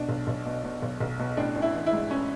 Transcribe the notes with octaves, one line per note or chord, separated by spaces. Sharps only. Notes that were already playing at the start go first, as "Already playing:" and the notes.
Already playing: B2 D4
B1
B1
B2
B2
B1
B1
B2
A1 D4
A1
E4
E3
E4
G#2
C#4